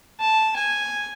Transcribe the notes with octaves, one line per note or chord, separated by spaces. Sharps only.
A5
G#5